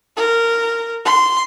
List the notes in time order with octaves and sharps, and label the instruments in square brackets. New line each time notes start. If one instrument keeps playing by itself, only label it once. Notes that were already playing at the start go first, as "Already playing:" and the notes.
[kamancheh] A#4
C6